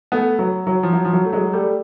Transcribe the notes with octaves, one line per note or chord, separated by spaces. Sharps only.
A3 B3
F#3
F#3
F3
F#3
F3
F#3
A3
F#3 G#3
G3 A3